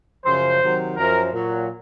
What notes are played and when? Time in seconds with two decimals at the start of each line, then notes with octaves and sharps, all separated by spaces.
0.25 F#2 C#3 F3 C5
0.61 C3 D#3 F#3
0.96 F#2 F3 A#4
1.32 A#2 F#3